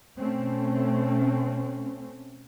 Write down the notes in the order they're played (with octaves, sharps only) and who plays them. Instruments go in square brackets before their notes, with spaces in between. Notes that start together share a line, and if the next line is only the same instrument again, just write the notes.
[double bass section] B2 A3 C4 C#4